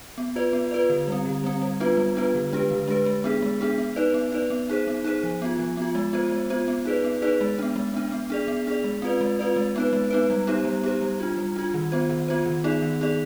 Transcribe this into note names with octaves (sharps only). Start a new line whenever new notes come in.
B3
F4 B4 D5
B3
F4 B4 D5
D3
G3 C4
D3
G3 C4
G3
B3 D4 F4 B4
G3
B3 D4 F4 B4
D3
G#3 D4 G4 B4
D3
G#3 D4 G4 B4
G#3
B3 D4 G#4
G#3
B3 D4 G#4
B3
D#4 B4 D5
B3
D#4 B4 D5
B3
D#4 G#4 C5
B3
D#4 G#4 C5
F3
B3 F4
F3
B3 F4
G#3
B3 F4 C5
G#3
B3 F4 C5
B3
D#4 G#4 B4 D5
B3
D#4 G#4 B4 D5
G#3
B3 D4
G#3
B3 D4
B3
D4 G#4 D5
B3
D4 G#4 D5
G#3
C4 F4 B4 D5
G#3
C4 F4 B4 D5
G#3
B3 D#4 B4
G#3
B3 D#4 B4
G3
B3 D#4 G4 C5
G3
B3 D#4 G4 C5
G3
D4 F4
G3
D4 F4
D#3
B3 F4 C5
D#3
B3 F4 C5
D#3
B3 D#4 G#4 D5
D#3
B3 D#4 G#4 D5